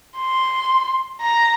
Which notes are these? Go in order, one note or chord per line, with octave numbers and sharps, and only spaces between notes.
C6
A#5